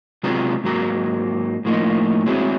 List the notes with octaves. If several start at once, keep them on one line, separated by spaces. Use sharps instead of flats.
C3 F#3 G#3 B3 F4 A#5
G#2 F#3 A#3 A#5
A2 F3 A#3 D#4
G#3 C4 C#4 E4 F#4 G#4